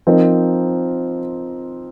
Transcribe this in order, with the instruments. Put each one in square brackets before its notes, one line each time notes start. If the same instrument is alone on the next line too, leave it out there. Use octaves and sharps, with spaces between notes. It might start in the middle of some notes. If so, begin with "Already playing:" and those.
[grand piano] F3 C4 D#4 A#4